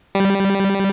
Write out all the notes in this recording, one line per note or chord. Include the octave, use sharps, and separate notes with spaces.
G3